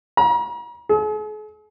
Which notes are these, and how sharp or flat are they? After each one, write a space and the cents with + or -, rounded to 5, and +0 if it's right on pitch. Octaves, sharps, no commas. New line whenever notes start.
A#5 +40
G#4 +45